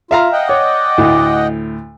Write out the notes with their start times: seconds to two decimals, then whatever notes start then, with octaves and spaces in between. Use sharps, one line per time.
0.11 F4 E5 F5 A#5
0.33 D#5 F#5 G5
0.49 C#5 D5
0.98 D2 A2